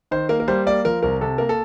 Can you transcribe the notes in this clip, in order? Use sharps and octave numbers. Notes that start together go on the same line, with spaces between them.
D#3 C5
A#3 A#4
A#4
G3 C5
A#3 D5
F3 A#4
C2 A#4
C3 A4
A#3 A#4
A4